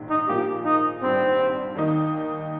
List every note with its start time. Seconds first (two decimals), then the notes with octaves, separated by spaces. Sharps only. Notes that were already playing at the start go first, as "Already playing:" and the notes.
Already playing: A#1 G#2 D#3
0.10 D#4
0.28 A#2 F3 A#3 F4 G4 G#4
0.64 D#4
1.01 G#1 G2 G3 C4
1.75 D#2 D#3 A#3 D#4